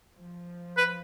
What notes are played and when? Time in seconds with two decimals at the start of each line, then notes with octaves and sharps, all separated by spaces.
0.16 F3
0.77 B4